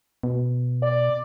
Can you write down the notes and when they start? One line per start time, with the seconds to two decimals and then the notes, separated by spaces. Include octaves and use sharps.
0.23 B2
0.82 D5